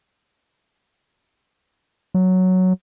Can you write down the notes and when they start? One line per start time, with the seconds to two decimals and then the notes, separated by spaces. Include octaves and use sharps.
2.14 F#3